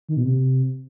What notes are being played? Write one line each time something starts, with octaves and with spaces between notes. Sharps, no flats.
D#3
B2
C3